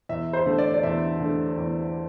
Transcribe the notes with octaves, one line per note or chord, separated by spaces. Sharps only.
E2 E5
C5
D3 A3
D5
D5
E2 E5
D3 A3
E2